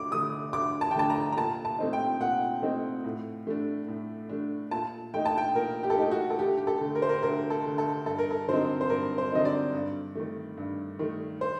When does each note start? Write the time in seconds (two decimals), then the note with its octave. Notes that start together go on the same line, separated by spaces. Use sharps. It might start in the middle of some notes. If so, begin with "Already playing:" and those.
Already playing: D2 D6
0.12 D3 A3 D4 D#6
0.53 D2 D6
0.81 A5
0.91 G5
0.95 D3 A3 D4 A5
1.10 A#5
1.32 A#5
1.37 A#2 A5
1.65 A5
1.79 A3 C4 D#4
1.93 G5
2.20 A#2 F#5
2.62 A3 C4 D#4
3.04 A2
3.47 A3 D4
3.88 A2
4.29 A3 D4
4.71 A#2 A5
5.14 A3 D#4 G5
5.25 A5
5.38 G5
5.55 A#2 A#4
5.83 G4
5.90 A4
5.97 A3 D#4 G4
6.11 F#4
6.30 A4
6.39 D2 G4
6.58 G4
6.67 A4
6.81 D3 A3
6.95 A#4
7.02 C5
7.09 A#4
7.23 D2 A#4
7.50 A4
7.64 D3 A3
7.78 A4
8.06 G2 A4
8.19 A#4
8.31 A4
8.48 D3 F#3 C4 D#4 C5
8.81 C5
8.90 G2 A#4
9.18 C5
9.32 D3 F#3 C4 D#4 D#5
9.45 D5
9.73 G2
10.15 D#3 A3
10.57 G2
10.99 D#3 A3
11.41 C5